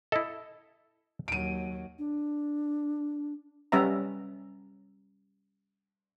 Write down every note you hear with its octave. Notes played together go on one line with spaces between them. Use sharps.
E4 A4 D#5
D#2 F#3 D7 D#7
D4
G3 C#4 B4 E5 A#5